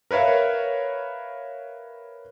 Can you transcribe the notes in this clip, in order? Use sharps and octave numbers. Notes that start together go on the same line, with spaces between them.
A#4 B4 C#5 E5 F5